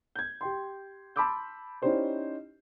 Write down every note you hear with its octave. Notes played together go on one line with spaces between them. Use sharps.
G6 G#6
G4 G5 C6
A5 B5 C6 D6 E6 G6
C#4 D#4 E4 G4 C5 D5